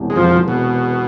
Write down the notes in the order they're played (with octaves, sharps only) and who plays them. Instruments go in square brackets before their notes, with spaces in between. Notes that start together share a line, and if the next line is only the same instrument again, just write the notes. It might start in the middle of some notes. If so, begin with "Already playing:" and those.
Already playing: [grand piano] E1 E2 C3
[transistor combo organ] G#3
F2 F3
B2